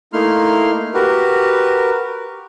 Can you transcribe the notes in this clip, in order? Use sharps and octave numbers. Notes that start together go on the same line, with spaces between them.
A3 A#3 D#4 E4 C6 F6
F#4 G4 A#4 B4